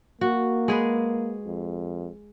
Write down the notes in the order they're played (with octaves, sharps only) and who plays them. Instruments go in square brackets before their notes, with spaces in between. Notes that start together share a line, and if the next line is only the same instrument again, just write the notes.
[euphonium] A#3 [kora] F#4
[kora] G#3 G#4 B4
[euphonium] F2